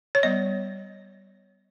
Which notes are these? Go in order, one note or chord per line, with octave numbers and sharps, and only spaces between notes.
C#5
G3 B3 D#5